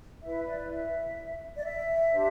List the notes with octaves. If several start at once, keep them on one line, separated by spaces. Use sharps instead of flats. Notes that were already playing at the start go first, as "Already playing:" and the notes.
E4 B4 E5
D5
E5
D5
E5
D4 G4 C5